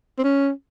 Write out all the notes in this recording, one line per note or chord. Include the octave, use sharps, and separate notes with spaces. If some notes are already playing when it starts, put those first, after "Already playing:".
C4
C#4